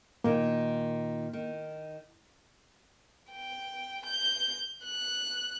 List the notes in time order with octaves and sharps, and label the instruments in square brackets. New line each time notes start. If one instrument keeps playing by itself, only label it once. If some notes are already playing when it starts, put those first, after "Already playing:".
[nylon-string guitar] A#2 D#3 [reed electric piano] A#3
[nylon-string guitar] D#3
[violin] G5
G6
F#6